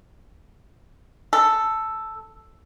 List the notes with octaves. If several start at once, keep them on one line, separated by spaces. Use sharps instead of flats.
A4